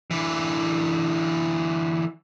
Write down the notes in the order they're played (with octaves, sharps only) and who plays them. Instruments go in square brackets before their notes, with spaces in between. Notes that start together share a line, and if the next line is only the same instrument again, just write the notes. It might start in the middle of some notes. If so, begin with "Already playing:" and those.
[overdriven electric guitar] D3 E3